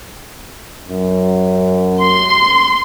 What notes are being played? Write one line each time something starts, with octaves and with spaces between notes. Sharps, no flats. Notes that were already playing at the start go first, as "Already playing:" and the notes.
F#2
C6